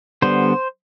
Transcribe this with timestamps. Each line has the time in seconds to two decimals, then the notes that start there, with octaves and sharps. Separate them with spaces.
0.22 D3 G3 B3 C5